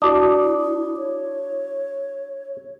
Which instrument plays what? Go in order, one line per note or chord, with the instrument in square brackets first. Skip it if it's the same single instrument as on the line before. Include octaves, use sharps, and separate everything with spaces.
[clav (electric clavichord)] D4 [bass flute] E4 [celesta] F#4 D6 D#6
[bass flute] C#5